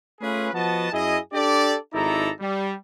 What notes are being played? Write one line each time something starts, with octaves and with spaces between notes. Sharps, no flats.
A3 C#4 F4 G#4 B4
F3 B3 F#4 D#5 A5
F#2 E4 G#4 D#5
D4 G4 A4 D5
G#1 D#4 E4 A4 D5 A#5
G3